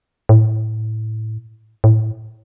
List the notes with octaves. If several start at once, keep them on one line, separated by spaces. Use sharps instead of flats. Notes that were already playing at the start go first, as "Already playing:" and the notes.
A2
A2